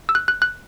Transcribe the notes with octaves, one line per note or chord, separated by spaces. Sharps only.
E6
F#6
F#6
F#6